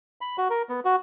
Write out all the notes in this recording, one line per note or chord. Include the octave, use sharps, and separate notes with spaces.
B5
F#4
A#4
B3
F#4